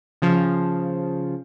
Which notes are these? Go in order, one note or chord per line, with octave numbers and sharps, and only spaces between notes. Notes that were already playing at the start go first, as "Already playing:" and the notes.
C#3 F3